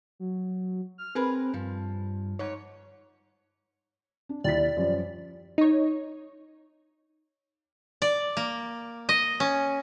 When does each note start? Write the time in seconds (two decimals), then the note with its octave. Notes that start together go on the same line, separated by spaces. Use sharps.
0.20 F#3
0.98 F6
1.15 C4 G#4 A#4 B4
1.54 G2 F3
2.39 G#2 C#5
4.29 D4
4.44 D#2 E4 D5 B6
4.77 F#2 F3 G3
5.58 D#4 C#5
8.02 D5
8.37 A#3
9.09 D#5
9.40 C#4